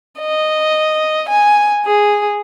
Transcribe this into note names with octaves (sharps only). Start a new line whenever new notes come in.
D#5
G#5
G#4